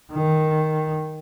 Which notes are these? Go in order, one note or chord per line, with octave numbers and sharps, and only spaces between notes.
D#3